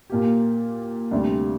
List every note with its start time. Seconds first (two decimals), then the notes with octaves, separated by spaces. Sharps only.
0.10 A#2 A#3 G4
1.11 D2 C3 G3 D4